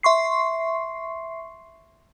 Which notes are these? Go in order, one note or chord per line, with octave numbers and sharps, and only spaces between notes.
E5 C6 C#6 C7